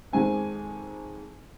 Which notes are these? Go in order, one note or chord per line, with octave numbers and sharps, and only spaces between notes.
F2 D#3 G#3 C4 G#5